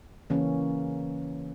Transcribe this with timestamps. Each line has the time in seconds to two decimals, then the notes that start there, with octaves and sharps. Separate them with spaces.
0.30 C#3 E3 A#3 C#4